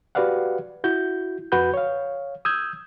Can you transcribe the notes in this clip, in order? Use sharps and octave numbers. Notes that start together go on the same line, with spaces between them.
F#4 G4 B4 D5 F5 F#5
E4 F#4 G6
F2 F#4 B4 F#5 B5 G6
C#5 F5
D#6 E6 G6 G#6